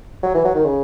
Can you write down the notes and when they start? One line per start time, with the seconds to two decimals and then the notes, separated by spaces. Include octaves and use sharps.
0.23 F#3
0.34 E3
0.44 F#3
0.55 D#3
0.65 C#3